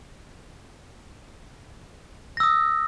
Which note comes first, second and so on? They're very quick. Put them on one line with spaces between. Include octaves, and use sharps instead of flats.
A#6 E6 D#6